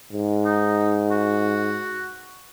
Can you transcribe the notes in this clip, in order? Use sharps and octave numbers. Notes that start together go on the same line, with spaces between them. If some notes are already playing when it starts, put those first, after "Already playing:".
G#2
D#4
F#4